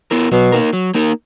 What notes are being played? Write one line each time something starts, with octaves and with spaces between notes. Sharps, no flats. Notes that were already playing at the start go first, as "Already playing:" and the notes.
B3 E4 A#4
B2 F#3
A#3 D#4 A#4
F#3
A#3 D#4 A#4